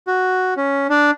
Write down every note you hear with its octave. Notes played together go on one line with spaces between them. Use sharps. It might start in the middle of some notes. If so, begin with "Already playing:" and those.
F#4
C#4
D4